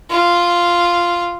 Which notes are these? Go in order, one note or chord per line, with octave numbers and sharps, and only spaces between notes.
F4